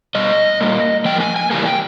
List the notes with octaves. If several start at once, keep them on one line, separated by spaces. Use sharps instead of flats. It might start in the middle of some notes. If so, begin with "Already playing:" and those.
B2 G3 D#5
A#2 G3 A#3
A2 F3 A#3 G5
G#5
G#5
C#3 E3 G3 A#3 G#5
G5